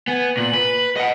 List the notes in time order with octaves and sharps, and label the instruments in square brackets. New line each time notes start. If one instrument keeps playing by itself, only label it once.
[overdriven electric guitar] B3 [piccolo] G#5
[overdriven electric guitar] A#2 [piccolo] F#7
[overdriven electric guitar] B4
D#5 F#5